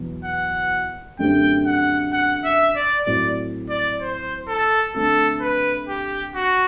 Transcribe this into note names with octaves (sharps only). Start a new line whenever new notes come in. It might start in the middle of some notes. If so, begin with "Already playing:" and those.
Already playing: E2 B2 F#3
F#5
F#2 D3 A3 C4 G4 G5
F#5
F#5
E5
D5
A2 F#3 A3 C4 F#4 D5
D5
C5
A4
D3 A3 C4 A4
B4
G4
F#4